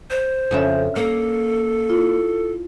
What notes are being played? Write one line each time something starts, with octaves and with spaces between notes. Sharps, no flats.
C5
F2 C#3 C#4 C#5 E5
A#3 A4
E4 F4